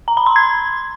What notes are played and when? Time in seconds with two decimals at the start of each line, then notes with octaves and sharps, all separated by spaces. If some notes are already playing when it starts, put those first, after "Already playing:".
0.08 A#5
0.17 B5
0.26 C6
0.36 G#6